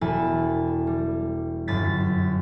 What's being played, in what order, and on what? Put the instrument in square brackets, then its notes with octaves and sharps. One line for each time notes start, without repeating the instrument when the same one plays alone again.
[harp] E1 E4 A4 G#5 A5
G3
G1 F#2 A6 B6